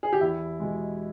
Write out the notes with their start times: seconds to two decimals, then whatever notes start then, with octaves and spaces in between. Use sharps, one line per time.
0.03 G#4
0.13 G4
0.21 E2 E4
0.60 B2 G#3